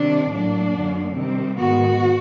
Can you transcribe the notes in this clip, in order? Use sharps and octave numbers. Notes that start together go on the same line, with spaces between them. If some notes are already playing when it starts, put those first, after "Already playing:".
Already playing: C3 D#3 G3 D4
A2 F#3 A#3 D4
F#2 D3 F#3 A#3
C3 D#3 G3 C4
G#2 D#3 G#3 B3 F#4